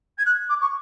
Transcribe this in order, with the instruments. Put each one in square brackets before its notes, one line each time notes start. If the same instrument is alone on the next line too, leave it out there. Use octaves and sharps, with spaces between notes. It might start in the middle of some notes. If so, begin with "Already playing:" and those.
[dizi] G#6
F#6
D6
C#6